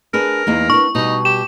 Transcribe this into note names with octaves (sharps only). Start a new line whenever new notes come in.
D4 G#4 A#4 B4
E2 A#3 D#4
B3 D4 C#6
B2 G3 D#4
G4 E7